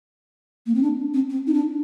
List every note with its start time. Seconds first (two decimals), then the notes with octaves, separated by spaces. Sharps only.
0.66 A#3
0.74 C4
0.82 D4
1.13 C4
1.29 C4
1.46 D#4
1.53 D4